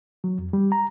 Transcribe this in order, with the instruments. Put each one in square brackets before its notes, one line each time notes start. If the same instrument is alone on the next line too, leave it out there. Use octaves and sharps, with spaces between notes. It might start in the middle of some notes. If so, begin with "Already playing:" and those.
[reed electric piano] F#3
F2
G3
A#5